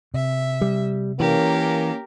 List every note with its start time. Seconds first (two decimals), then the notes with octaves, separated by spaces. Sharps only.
0.14 C3 E5
0.61 G3
1.20 E3 A#3 C#4 G4 A#4